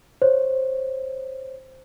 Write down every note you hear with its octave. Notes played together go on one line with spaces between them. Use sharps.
C5 C#5